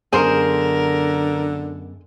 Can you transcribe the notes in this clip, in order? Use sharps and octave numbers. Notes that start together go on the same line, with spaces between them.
F#2 D3 B3 G#4 A#4 C5